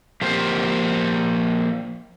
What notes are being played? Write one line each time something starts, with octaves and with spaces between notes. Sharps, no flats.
F3 A#3 G4 C5